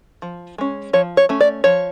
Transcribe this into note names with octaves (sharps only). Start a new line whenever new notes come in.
F3
G#3 C#4
F3 C#5
C#5
A3 C#4
D5
F3 C#5